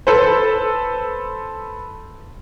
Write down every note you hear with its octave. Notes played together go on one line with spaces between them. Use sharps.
A4 B4 C5